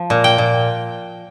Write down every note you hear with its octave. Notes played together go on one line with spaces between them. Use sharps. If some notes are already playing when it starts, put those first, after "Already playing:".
Already playing: F3
A#2
G5
A#2